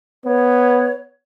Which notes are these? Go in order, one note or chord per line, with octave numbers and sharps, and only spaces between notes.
B3 C#5